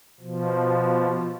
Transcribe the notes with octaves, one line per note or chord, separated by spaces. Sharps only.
B2 F3